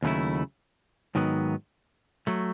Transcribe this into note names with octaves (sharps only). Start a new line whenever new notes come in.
D#2 C#3 F#3 A3 E4
G#2 D#3 F#3 B3
F#3 A3